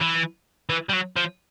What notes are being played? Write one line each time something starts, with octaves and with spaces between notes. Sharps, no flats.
E3
E3
G3
F#3
F3